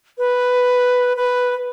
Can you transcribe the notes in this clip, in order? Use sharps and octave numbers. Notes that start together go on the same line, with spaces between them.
B4
B4